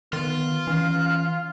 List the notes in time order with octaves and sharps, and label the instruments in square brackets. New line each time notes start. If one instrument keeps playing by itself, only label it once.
[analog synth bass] D#3 [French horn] B3 [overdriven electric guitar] F4
[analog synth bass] E3 [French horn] C#4 [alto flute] F5